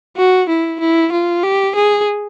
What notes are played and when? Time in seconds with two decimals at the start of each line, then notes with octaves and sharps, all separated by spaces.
0.17 F#4
0.49 E4
0.80 E4
1.12 F4
1.43 G4
1.75 G#4